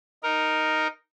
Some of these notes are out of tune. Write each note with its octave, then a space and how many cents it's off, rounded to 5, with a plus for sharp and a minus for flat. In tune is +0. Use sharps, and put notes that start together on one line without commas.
D#4 +0 A#4 +0